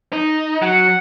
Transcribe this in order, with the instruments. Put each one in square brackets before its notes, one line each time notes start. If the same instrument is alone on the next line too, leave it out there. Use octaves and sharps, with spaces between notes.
[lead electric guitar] D#4
[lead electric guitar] F#3 [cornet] F#5